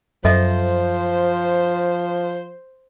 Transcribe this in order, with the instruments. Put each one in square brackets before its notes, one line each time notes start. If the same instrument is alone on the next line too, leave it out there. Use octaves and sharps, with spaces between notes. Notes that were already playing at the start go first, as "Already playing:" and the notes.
[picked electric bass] F#2 [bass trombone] F3 [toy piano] A4 D#5 E5 [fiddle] C5